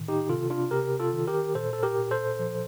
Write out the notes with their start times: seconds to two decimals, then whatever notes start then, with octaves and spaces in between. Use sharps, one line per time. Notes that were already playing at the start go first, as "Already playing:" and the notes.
Already playing: A2 D#3
0.08 D#4 G4
0.29 C3 F4 A4
0.50 D4 F4
0.71 C3 G4 A#4
1.00 F4 A4
1.13 D#3
1.27 G4 A#4
1.55 A#2 A4 C5
1.73 A4
1.83 G4 A#4
1.98 A#2
2.11 A4 C5
2.39 F3